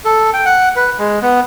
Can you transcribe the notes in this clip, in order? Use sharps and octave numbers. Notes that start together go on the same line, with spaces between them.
A4
G5
F#5
B4
G#3
B3